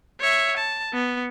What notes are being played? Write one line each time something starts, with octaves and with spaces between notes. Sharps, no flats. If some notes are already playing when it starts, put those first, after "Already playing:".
C#5 E5
A5
B3